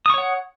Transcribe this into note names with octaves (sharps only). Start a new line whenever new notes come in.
C#5 F#5 C#6 D#6